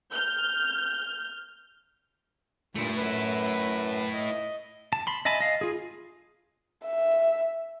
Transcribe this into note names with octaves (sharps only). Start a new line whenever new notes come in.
F6 G6
G2 A#2 A3 E4
F#2 B4
D#5
A5
B5 C6
D#5 E5 G#5 A5 B5
D#5 F5
F4 G#4
E5